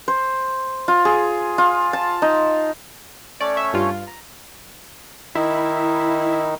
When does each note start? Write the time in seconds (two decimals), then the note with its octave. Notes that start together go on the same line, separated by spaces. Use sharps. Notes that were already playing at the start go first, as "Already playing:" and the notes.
0.08 C5
0.88 F4
1.05 G#4
1.58 F4
1.93 A5
2.22 D#4
3.40 A3 C#4 C#5 D5
3.57 E5
3.73 G2 F4
4.07 A#5
5.35 D#3 D#4 E4